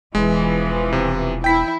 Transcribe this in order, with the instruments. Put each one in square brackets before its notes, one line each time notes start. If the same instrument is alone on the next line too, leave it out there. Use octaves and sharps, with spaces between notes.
[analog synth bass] E1 [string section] E3 F3 [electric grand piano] G#3
[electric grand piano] C3
[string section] E4 [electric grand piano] G5 B6